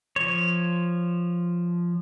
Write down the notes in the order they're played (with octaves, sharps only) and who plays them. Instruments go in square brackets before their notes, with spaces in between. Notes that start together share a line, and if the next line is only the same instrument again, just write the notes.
[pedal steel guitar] F3 C#5